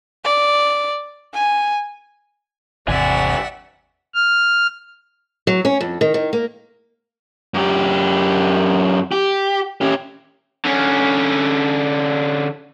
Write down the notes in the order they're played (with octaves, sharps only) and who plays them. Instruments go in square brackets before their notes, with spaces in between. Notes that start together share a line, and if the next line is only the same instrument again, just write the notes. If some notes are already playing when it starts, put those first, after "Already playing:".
[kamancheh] D5
G#5
[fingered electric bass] G#1 E2 C3 [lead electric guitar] G2 G#5 [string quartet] D5 E5 F#5
[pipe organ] F6
[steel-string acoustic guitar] F#3
C#4
F2
D#3
D#3
A#3
[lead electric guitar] F#2 G4
G4
C#4 G4
[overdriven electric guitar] D3 C#4